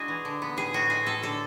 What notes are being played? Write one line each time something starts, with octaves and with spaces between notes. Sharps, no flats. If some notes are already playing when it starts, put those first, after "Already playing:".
Already playing: G#3 D4 E4 F#4 G#4
E3
D3
B3
A2 G#4
A2 F#4
G#3 G#4
A2 A4
D3 A4